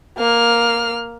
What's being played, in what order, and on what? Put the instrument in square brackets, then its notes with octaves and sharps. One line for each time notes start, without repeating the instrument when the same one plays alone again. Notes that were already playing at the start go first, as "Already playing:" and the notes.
[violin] A#3 F6